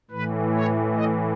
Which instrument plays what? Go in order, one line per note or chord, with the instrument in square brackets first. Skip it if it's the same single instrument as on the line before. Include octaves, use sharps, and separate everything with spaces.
[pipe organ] A2 E3 B4
C#5
D#5